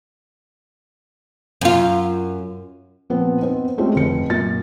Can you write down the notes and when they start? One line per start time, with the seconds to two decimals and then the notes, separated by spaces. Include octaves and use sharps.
1.61 F#2 F4
3.10 A#2 F3 B3 C4
3.42 B3 C4 D#4
3.78 G#3 A3 C4 C#4 F4 G4
3.96 F1 C#7
4.30 F#2 A#2 A6